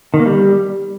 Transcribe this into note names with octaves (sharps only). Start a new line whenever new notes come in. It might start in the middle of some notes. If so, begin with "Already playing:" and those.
D#3
A#3
G3